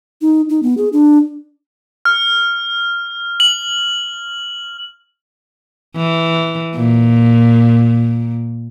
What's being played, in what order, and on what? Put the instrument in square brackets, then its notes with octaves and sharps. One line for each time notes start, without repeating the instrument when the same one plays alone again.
[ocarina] D#4
D#4
B3
G#4
D4
[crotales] F6
F#7
[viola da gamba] E3
A#2